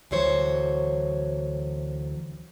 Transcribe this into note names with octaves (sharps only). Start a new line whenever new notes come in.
D2 E3 F#3 C5 C#5